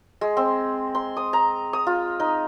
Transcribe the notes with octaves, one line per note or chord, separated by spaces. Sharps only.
G#3
C4
C6
D#6
A#5
D#6
F4
D#4